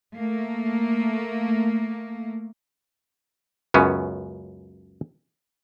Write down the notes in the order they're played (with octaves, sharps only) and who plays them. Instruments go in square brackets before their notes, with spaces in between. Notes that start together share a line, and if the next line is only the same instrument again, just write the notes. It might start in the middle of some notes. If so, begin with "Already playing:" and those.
[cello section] A3 A#3
[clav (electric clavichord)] C#2 F#2 B3 C#4